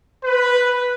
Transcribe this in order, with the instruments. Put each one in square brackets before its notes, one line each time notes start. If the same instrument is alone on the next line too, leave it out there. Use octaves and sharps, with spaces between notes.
[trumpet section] B4